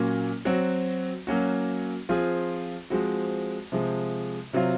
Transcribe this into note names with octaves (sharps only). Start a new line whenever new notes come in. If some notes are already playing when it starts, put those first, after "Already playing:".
Already playing: A#2 F#3 A#3 C#4
F#3 C4 F#4
F#3 A#3 C#4 F#4
F3 C4 F4 G#4
F3 G#3 C4 F#4
C3 F3 G#3
C3 F#3 C4 F4